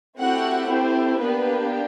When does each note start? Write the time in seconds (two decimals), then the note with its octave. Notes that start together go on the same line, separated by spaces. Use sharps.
0.18 A3 C4 E4 F#4 G4 F#5
0.69 C4 C5
1.19 A#3 B3 D4 G4 B4